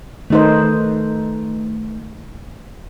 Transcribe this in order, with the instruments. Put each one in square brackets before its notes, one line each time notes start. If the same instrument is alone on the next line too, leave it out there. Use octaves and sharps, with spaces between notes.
[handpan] D#3 D#4 C5 [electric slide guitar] A3 A4 B4